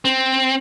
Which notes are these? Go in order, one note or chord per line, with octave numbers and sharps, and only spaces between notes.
C4